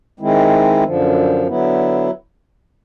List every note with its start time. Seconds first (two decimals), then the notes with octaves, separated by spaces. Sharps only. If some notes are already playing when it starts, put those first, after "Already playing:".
0.20 D#3 G#3 C4 E4
0.84 F#2 D3 F3
1.47 D3 F#3 B3 E4